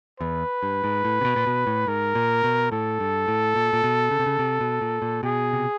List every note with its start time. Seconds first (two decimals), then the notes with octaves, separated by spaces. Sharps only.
0.20 E2 B4
0.63 G2
0.84 G#2
1.05 A2
1.21 C3
1.25 B2
1.36 A#2
1.47 B2
1.67 A2
1.87 G#2 A#4
2.15 A#2
2.44 B2
2.72 A2 A4
3.00 G2
3.28 A2
3.56 A#2
3.73 A#2
3.84 B2
4.11 C#3
4.19 C3
4.26 C#3
4.39 C3
4.60 B2
4.81 A#2
5.02 A#2
5.23 B2 G#4
5.53 C3